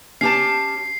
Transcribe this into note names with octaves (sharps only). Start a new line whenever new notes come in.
C#4 G4 A5 C7